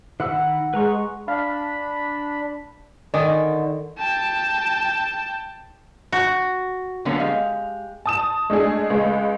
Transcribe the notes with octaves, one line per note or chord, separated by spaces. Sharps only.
D#3 F#5 B5 E6
G#3 B4 A#5 C#6
D4 F5 B5
D3 D#3 D5 D#5 G#5
G5 A5
F#4
D3 F3 F#3 A#3 B3 C#4
G#3 G4 F5
A5 D#6 E7
G#3 A3 D4 G#4
C#2 G#3